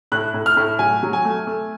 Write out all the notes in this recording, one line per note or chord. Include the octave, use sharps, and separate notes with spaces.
A2 F#6
A2
F6
A2
F#3 G#5
F#3
G#5
A3
A3